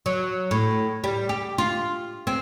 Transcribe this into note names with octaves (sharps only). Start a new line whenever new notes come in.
F#3
A2
G3
G4
F4
C4